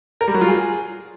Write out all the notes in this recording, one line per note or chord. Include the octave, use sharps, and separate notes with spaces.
A#4
G3
F#3
F4
G#4